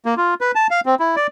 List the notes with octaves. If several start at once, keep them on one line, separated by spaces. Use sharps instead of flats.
A#3
F4
B4
A5
F5
C4
E4
D5